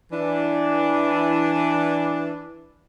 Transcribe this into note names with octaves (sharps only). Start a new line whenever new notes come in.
E3 D4